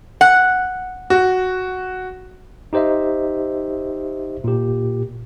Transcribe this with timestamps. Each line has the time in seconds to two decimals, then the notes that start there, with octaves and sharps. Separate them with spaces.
0.21 F#5
1.10 F#4
2.73 D#4 G4 C5 D#5 E5
4.44 A#2 G4